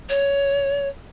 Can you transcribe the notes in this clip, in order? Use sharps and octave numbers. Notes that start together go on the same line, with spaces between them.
C#5